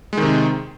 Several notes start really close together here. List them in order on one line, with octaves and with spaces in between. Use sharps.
G#3 D#3 C3